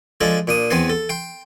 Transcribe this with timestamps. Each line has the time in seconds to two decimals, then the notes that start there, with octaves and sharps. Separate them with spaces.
0.21 F3 G#3 D4 G#4 A4
0.47 A#2 D4 D#6
0.70 E2 B3 C4 G#5 C6
0.90 A4
1.09 G5 C6